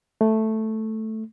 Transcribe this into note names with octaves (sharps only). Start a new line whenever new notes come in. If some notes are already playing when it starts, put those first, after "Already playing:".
A3